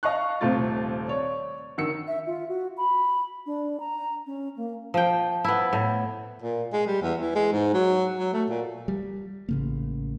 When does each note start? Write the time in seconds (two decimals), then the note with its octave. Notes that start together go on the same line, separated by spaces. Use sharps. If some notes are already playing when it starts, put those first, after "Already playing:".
0.03 D#5 F5 A5 C#6 F#6
0.41 D#1 C3 A3 C4 F4 A6
1.08 C#5 D5
1.78 D3 D#3 E6 C#7
2.08 E5
2.27 F4
2.48 F#4
2.77 B5
3.46 D4
3.80 A#5
4.26 C#4
4.56 A#3
4.94 F3 G5
5.44 B3 E4
5.73 A2
6.42 A#2
6.73 G#3
6.87 G3
7.02 E2
7.21 E3
7.35 G#3
7.52 G#2
7.74 F#3
8.19 F#3
8.33 A3
8.49 A#2
8.88 G3
9.49 A1 C#3 A#3